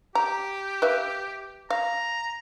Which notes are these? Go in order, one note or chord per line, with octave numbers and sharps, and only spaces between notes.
G4 A#5
B4 E5 F5
F5 A#5